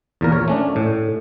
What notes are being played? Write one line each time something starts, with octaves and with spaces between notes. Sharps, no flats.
E2 A#2 A#4
C#5
A3 C#4 D4
A2